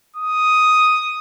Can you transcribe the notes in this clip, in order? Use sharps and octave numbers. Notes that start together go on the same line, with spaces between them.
D#6